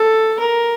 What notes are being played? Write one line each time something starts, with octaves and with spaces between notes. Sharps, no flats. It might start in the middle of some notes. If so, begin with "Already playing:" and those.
Already playing: A4
A#4